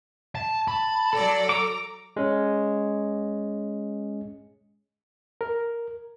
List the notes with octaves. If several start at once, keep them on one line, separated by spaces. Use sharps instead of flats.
A5
A5 B5
F#3 A4 D5 A#6
A#5 D6
G#3 C#4
A#4